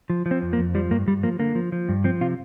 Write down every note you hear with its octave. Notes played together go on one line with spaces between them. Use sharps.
F3
F3
C4
F2
A#3
F2
F3 G3
G2 A#3
G2 G3
F3 A#3
D3 A#3
F3
F3
G2
F3 C4
C3 F4